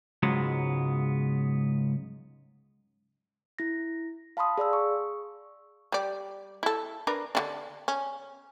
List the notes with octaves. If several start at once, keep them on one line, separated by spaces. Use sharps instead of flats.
C#2 G#2 F#3 G#3 B3
E4 A#6
F5 A5 B5 C6 D#6
G#4 D5 F5 E6
C#6
G3 D5
E4 A4
D4 A#4 B4
D3 C#4 D4
C#4